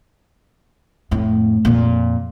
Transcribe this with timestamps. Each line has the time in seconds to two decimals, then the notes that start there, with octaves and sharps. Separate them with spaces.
1.11 F2 A2
1.65 F2 A#2